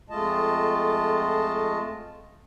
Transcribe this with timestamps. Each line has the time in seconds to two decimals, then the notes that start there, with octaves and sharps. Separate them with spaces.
0.10 F2 G#3 A3 F4 D#5 A5